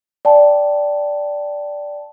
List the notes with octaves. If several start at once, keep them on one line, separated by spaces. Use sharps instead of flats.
D5 G5 A5